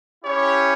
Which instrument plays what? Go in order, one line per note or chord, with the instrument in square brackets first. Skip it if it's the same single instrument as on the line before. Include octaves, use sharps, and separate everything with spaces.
[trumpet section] C#4 E4 G4 C#5